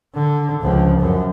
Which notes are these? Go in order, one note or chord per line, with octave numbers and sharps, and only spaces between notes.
D3
C#2 F3
F#2